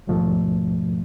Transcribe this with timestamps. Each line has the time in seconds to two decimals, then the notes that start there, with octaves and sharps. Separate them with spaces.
0.07 D#2 G#2 B2 F3 A3